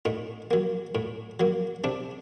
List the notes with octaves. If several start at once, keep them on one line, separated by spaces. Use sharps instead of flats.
A2 D#4
F#3 A#3
A2
F#3 A#3
C3 D4